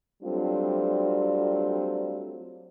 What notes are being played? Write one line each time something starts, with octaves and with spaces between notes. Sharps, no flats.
F#3 G3 A3 C4 D4 F4